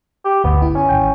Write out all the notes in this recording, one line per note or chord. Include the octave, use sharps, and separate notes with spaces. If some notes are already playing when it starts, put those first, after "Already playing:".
G4
G1 D2 B3
E4
C#4
G#1 G5